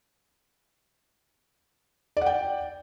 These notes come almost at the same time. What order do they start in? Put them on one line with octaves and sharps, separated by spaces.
D5 F#5 G5